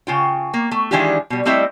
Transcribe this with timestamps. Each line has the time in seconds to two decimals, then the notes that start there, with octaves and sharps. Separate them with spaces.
0.07 C#3 F4 G5
0.54 A#3
0.71 A3
0.91 D#3 E3 G#3 D4 F4 G4
1.30 B2 G3
1.45 G3 A3 C4 E4 D#5 E5